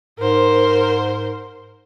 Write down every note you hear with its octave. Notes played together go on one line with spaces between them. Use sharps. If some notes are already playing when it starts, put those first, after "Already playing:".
G#2 A#4 C5